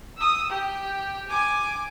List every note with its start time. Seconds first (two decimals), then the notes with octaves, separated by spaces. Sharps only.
0.17 D#6 E6
0.50 G4
1.28 G#5 D6